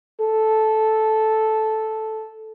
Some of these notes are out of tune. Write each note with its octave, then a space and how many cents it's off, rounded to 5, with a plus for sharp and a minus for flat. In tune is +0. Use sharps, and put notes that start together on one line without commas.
A4 -10